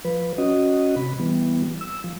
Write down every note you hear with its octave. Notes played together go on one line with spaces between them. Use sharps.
F3 B4
C#4 F#4 D#5
C3 B5
E3 G3 B3
E6
F3